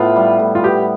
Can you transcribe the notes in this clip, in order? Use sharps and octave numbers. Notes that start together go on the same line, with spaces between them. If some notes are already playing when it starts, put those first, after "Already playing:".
Already playing: A2 B3 F4
G3
A2
F4
B3 G4